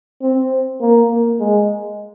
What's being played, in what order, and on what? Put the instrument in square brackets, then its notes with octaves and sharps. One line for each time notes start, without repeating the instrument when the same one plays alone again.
[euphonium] C4
A#3
A#3
G#3